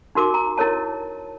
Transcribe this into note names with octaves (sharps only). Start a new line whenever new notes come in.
D#4 F#4 A#4 D6
A#5
E4 A#4 C#5 A5